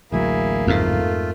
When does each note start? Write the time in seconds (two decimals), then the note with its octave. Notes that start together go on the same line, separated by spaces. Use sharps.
0.12 A1 D2 F#3 A#3 E4 G#4
0.67 F2 G#2 A3 F4